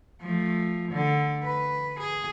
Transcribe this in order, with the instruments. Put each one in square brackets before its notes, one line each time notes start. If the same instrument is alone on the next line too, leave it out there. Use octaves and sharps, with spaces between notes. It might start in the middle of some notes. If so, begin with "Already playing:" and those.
[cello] F3 A3
D3
B4
G#4